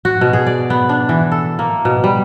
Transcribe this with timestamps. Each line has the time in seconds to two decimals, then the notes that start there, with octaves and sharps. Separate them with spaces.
0.05 F#4
0.21 B2
0.33 G#4
0.46 D5
0.70 B3
0.89 D4
1.09 E3
1.31 A4
1.59 A#3
1.85 B2
2.04 G3